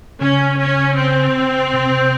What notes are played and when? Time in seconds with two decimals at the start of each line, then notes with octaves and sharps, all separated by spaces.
0.21 C#3 C#4
0.59 C#4
0.98 C4
1.74 C3